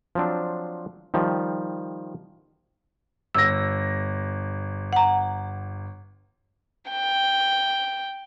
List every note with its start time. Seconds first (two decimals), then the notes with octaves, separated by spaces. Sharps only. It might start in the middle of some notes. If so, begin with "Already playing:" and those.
0.15 F3 F#3 C4 D4
1.14 D#3 F3 G3
3.35 G1 E6 A#6
4.93 F#5 A#5
6.90 G5